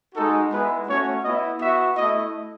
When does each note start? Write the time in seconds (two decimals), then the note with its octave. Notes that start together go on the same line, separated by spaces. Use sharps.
0.14 G#3 D#4 F#4 A4
0.52 G#3 B3 E4 B4
0.87 A3 C#4 F#4 C#5
1.23 B3 E4 D#5
1.60 B3 F#4 E5
1.97 A3 E4 D#5